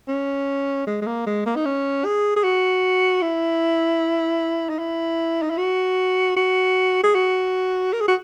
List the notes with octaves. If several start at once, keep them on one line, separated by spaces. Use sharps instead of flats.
C#4
G#3
G#3
A#3
G#3
A#3
D#4
C#4
G#4
G#4
F#4
E4
D#4
E4
D#4
E4
F#4
F#4
G#4
F#4
A#4
G#4
F#4